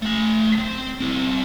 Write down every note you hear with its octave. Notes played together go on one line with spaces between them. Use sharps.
A3 G#5
C4
C4 E4